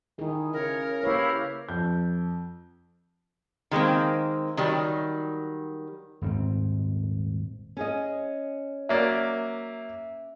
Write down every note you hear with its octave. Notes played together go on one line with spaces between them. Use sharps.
D#3 E4 G#4
C#3 A#4 C#5
A#3 E4 G4 B4 C#5 F5
F2 G6
D#3 G#3 A#3 C4
D#3 F#3 G3
D#1 G#2 A#3 C4
C#4 G#4 D#5
F#3 A#3 D5 E5